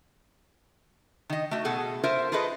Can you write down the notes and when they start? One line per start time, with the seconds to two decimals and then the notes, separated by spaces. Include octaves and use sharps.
1.30 D#3 D#5
1.51 A3 F#4
1.65 B2 G#4 A4 F#5
2.03 F4 A#4 C5 E5
2.32 F4 G#4 A4 B4 D#5